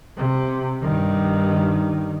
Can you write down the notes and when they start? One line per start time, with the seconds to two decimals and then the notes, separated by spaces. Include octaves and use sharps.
0.17 C3
0.82 G2 D#3